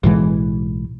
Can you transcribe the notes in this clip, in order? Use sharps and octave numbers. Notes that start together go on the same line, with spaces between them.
B1 A2 E3 G#3